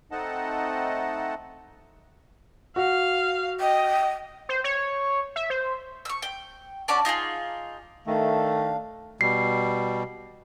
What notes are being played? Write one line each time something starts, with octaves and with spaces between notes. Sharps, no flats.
A3 C4 D#4 D#5 F#5 A5
F#4 F5
D#5 G5
C5
C#5
E5
C5
C#6 E6
G5
C#4 F#4 D5 A5
D#4 F4 G4 G#4
D#3 A3 D4 F5
B2 G3 C7